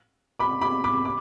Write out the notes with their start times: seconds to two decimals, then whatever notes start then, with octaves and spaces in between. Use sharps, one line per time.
0.39 B5 D6
0.61 B5 D6
0.84 B5 D6
1.05 D6